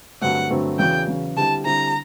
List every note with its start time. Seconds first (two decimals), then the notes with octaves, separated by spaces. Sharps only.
0.21 G2 D3 F#3 A3 C4 F#5
0.50 G2 D3 F#3 A3 C4
0.79 E2 C#3 F#3 G5
1.08 E2 C#3 F#3
1.37 D3 G3 C4 E4 A5
1.65 D3 G3 C4 E4 A#5